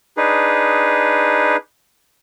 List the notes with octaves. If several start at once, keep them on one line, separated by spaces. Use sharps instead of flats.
D4 D#4 G#4 B4